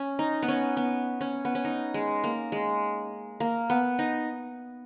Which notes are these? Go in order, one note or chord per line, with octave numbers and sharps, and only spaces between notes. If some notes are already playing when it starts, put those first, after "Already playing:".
Already playing: C#4
D#4
B3
C#4
B3
C#4
B3
C#4
D#4
G#3
A#3
G#3
A#3
B3
D#4